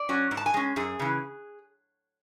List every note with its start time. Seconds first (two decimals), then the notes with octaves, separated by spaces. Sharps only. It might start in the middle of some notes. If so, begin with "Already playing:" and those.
Already playing: D5
0.09 F#3 C#4
0.31 G#2
0.37 A5
0.46 G#5
0.54 G#3 C#4
0.76 F#2 G#4
0.99 C#3 E3